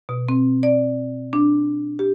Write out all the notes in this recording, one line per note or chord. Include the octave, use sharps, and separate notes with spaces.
B2
C4
D5
D4
G4